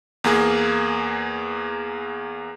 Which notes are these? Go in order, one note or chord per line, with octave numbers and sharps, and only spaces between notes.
E2 A#3 G#4